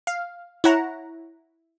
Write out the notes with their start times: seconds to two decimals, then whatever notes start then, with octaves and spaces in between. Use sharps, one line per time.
0.07 F5
0.64 E4 C#5 F#5 A#5